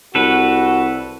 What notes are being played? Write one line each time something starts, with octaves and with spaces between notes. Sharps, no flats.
C2 F#4 A4 B4